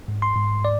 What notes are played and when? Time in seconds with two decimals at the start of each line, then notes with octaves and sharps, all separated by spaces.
0.08 G#2
0.22 C6
0.36 G#2
0.65 D5